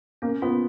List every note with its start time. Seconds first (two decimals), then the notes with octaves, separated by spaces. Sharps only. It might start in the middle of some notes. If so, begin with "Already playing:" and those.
0.22 A#3 C#4
0.42 B3 F4